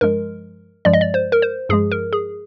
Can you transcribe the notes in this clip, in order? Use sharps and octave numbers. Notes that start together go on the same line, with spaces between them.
G2 F3 G#3 A#4
G2 F3 G#3 D5
D#5
D5
C5
A#4
C5
G2 F3 G#3 G#4
A#4
G#4